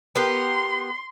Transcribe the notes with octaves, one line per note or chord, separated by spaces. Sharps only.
B3 G4 A#4 C6